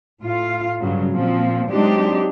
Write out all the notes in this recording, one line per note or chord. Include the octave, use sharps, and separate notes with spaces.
A2 F4 F5
G2 C#3 F#3
A#2 F3 C4
F#3 G#3 C4 D4 D#4 G4